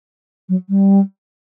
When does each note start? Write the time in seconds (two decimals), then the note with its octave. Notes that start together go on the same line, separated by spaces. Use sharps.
0.48 F#3
0.69 G3